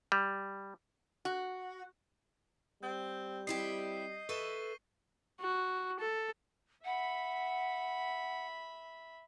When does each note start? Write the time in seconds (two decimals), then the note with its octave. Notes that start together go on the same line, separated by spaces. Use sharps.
0.12 G3
1.25 F#4
2.83 G3 C4 G6
3.47 C4 E4 G4 D#5 C7
4.29 A4 B4 E5 C#6 D#7 G7
5.41 F#4
6.00 A4
6.85 E5 F#5 B5